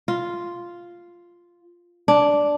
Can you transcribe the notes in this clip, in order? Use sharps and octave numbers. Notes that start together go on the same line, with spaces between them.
F4
D4